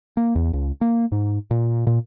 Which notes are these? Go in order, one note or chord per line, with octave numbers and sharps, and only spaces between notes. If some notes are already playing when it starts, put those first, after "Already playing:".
A#3
E2
C#2
A#3
G#2
A#2
A#2